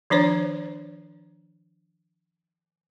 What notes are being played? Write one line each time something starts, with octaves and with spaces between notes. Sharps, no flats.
D#3 F3 D4 C5 C#5